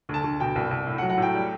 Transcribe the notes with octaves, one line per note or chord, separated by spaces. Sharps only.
D2 A5
D2
B2 G5
C2
C2
A2
F#5
F#3
F#5
A2 G5
G3